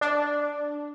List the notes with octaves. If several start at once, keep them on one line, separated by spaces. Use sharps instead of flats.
D4